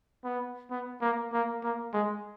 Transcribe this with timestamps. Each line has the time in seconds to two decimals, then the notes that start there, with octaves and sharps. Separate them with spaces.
0.24 B3
0.71 B3
1.01 A#3
1.33 A#3
1.63 A#3
1.93 G#3